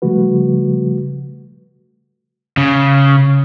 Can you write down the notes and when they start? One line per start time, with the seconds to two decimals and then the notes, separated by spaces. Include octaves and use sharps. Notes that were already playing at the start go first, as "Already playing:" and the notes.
0.02 C#3 F3 G3 A3 F#4 B4
2.57 C#3